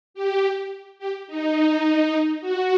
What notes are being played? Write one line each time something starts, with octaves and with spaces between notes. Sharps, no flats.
G4
G4
D#4
D#4
F#4